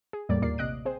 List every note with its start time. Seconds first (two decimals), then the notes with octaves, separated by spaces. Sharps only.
0.13 G#4
0.29 E2 A2 G3 A#3 D5
0.42 D#2 A#2 A#3 D5 C7
0.58 A1 C3 D#5 F#6 D7
0.85 C4 G#4 C5